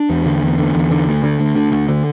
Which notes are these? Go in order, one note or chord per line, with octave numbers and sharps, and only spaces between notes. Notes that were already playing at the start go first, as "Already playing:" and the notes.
Already playing: D4
E2
D3
E2
D3
E2
D3
D2
D3
D2
D3
D2
D3